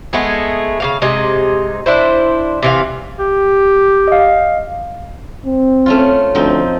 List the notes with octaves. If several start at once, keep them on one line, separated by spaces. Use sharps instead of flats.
G#3 A3 B3 G#4
C#3 A#3 F5
C3 G#3 D#4
D4 E4 C5
C3 E3 F5
G4
D#5 F5
C4
A3 C#4 F4
D2 F3 C4 D#4